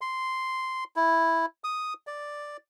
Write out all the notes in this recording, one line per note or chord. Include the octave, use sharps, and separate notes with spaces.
C6
E4
D#6
D5